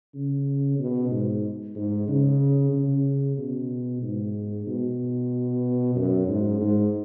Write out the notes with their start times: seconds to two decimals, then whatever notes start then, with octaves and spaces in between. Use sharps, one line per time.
0.14 C#3
0.79 B2
1.11 G#2
1.76 G#2
2.08 C#3
2.73 C#3
3.37 B2
4.02 G#2
4.67 B2
5.95 F#2
6.28 G#2
6.60 G#2